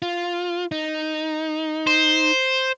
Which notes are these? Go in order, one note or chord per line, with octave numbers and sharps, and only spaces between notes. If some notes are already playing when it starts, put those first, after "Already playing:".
F4
D#4
C5